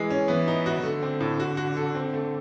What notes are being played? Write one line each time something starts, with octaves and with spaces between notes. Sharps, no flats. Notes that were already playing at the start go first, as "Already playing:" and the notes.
Already playing: E3 G#3
C#4
E3 B3
D#4
F#4
D3 A3
C4
A2
F#4
F#4
A4
C4
A3